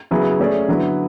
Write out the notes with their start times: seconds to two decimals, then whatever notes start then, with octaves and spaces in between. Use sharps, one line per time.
0.11 C#3 F#3 B3 E4 G#4
0.40 A3 C#4 G#4 D5
0.68 D3 F#3 B3 E4 B4